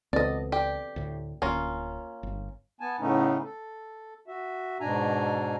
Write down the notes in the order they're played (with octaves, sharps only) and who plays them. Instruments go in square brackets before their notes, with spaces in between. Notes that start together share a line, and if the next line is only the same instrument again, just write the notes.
[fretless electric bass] C#2 [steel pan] B3 C4 A4 [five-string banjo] D5 D#5
[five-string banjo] G4 [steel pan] A4 D5 G5
[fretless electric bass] D2 A2
[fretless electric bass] D1 D2 [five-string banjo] A#3 C#4 F4
[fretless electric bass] G1
[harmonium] B3 G#5 A5
A2 C#3 A3 B3 C#4 D#4
A4
F#4 E5
G#2 B2 D4 G#5 A#5